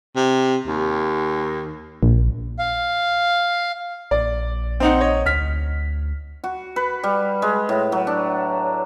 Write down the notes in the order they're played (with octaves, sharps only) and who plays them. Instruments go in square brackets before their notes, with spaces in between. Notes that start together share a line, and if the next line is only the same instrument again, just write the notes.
[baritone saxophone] C3
D#2
[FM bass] A#1
[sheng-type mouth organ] F5
[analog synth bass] A#1 [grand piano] D5
[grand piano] C4 D#4 F#5
C#5 D#5
[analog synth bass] D2 [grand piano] F6 B6
[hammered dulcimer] F#4
B4
G3
G#3
A2
F#3
D4